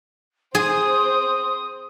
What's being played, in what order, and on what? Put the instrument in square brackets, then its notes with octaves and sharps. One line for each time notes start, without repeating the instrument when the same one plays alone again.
[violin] C4 C5 [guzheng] G#4 [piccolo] D#6